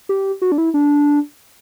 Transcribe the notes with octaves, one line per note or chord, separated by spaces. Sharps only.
G4
F#4
D4
E4
D4